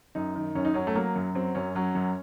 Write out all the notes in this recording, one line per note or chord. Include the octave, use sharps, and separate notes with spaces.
F#2 D#4
D#3
F#2 C#4
D#4
F#3 C#4
A3
F#3 A#3
F#2
F#3 C4
F#2 C#4
F#3 C#4
F#2